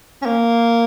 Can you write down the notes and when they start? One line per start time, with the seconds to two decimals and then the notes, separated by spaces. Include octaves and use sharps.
0.22 C#4
0.26 A#3